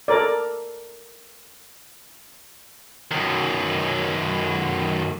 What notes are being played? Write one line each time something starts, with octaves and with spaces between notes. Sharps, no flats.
A4 A#4 D5
F#2 D#3